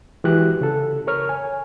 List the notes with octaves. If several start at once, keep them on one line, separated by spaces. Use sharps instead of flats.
E3 G#3 F#4 G4 F#6
C#3 A4
A#4 C#5 F6
G#5